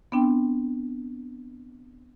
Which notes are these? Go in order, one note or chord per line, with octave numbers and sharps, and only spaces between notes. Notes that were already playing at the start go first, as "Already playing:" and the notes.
B3 C4 D4 G5